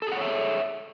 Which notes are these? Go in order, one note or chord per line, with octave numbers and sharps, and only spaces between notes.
G#4 A4 C#5 E5 F#5